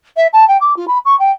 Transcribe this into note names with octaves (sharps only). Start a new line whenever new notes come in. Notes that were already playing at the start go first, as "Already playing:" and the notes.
E5
A5
G5
D6
F4
B5
C#6
G5